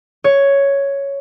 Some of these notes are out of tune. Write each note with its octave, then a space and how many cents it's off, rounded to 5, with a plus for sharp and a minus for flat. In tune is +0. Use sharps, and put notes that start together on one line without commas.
C#5 +5